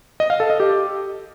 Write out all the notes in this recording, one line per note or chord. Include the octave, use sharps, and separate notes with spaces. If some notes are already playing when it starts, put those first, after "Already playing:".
D#5
F5
A4
D#5
G4